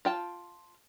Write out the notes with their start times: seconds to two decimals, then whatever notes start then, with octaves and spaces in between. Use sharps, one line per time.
0.05 F4 G5 A5